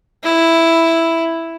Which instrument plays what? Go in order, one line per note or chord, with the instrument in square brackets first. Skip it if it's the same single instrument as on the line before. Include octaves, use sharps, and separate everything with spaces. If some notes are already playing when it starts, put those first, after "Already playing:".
[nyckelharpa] E4